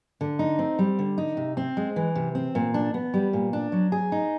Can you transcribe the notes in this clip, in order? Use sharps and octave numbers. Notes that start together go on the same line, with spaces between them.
D3
D#4
C4
G3
D3
D#4
C3
C4
G#3
E3
C3
C4
A#2
D4
B3
G3
A#2
D4
F#3
G#4
D#4